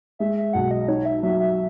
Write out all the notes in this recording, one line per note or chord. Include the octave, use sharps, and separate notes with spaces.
G#3 E5
E5
B1 F#5
D#5
D#4 C#5
E5
F#3 E5
E5